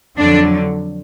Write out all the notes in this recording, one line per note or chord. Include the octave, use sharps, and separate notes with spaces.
F2 D3 F#3 D4